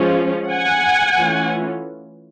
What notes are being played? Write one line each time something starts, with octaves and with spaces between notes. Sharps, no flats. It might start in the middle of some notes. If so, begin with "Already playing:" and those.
Already playing: F3 G#3 C#4 F4
F#5 G#5
E3 A3 C#4 F4